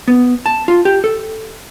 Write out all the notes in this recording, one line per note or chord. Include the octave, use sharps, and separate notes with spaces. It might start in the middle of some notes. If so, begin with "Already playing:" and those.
B3
A5
F4
G4
A4